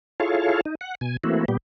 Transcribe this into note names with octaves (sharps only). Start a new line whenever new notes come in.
E4 F4 G#4 A4 C#5 F5
D#4
F#5
B2 G#5
E3 A3 A#3 C4 E4 F#4
A#2 G3 B3 G4